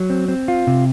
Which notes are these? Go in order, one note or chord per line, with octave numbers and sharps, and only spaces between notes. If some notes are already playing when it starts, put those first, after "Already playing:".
Already playing: F#3
C4
C4
F4
C3